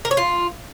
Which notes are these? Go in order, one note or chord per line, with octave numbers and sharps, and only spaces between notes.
A#4
C#5
F4